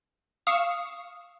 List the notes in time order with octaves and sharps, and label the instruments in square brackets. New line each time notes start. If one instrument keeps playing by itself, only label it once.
[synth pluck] F5 C#6 E6 [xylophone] D#6